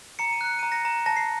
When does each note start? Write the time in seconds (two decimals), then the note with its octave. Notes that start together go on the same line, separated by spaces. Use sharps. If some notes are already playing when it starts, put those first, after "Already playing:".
0.19 A#5 C#7
0.33 D#7
0.41 F#6 C#7
0.59 A#5 D#7
0.72 A#6 C#7
0.85 A#5
1.06 A5 A#6
1.16 C7